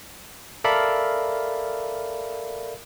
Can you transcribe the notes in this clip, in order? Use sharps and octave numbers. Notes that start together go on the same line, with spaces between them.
A4 A#4 D5 E5 F5 B5